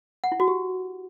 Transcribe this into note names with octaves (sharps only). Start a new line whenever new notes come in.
F#5
E4
F#4
G4